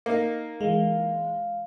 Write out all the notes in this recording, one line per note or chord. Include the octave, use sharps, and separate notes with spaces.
A#3 D#4
E3 G#3 F5